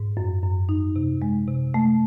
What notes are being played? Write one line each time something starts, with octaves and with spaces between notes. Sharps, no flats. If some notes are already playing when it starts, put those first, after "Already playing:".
Already playing: G#2
F#2
F#2
D#4
C3
G#3
C3
A3